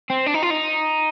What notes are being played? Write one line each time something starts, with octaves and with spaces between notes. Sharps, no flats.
C4
D4
D#4
F4
D#4